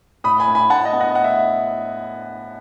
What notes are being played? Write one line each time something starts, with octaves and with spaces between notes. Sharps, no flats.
A2 B5 D#6
G#5 B5
A2
G#5 B5
A2 F#5 A5
D#5 F#5
B3
D#5 F#5
A2 F#5
E5